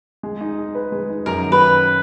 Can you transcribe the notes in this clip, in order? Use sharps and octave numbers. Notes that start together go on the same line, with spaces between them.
G#3
D#4
G#4
B4
G#3
D#4
F#2 A#4
D#3
B4